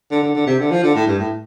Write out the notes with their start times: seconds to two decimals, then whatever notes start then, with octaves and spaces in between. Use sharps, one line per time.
0.11 D3
0.23 D3
0.35 D3
0.47 C3
0.60 D3
0.71 F3
0.84 D3
0.96 A2
1.08 G2
1.19 A2